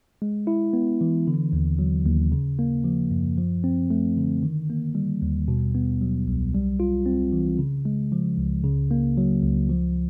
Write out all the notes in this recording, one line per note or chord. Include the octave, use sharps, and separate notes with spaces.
G#3
E4
B3
E3
D3
D#2
F#3
D#2
C#3
A#3
F3
F#2
F3
C4
A3
D3
D#3
A#3
G3
D#2
B2
B3
F#3
C2
G3
F4
C4
E3
C#3
G#3
F3
C#2
C#3
A#3
F#3
C#2
F3